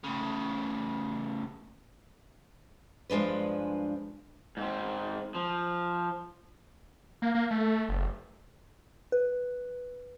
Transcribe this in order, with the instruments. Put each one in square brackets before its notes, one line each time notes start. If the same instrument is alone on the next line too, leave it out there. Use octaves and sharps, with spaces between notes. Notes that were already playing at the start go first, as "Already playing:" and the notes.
[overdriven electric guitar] A2 C#3
[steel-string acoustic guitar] G2 F3 G#3 D4 B4
[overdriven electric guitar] G#2 C4
F3
[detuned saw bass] A#3
A#3
A3
F#1
[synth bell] B4